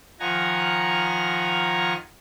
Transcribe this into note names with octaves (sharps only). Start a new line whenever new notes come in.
D#3 F3 F#5 G#5 A#5